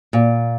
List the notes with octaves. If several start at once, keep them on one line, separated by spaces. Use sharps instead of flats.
A#2